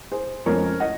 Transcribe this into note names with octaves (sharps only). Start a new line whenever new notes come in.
G#4 C5
F2 C#3 F3 G#3 C4 A#4 C#5
D#5 F#5